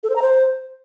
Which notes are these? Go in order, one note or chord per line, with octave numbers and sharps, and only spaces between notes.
A4
C5
A#5
C5